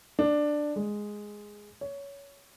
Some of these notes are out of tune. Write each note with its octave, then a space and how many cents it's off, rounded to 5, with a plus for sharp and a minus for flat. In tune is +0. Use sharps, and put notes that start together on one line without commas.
D4 +10
G#3 +0
C#5 +15